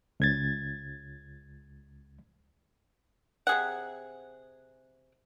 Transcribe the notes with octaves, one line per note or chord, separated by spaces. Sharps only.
C#2 G#6 A6
C3 G#4 F#5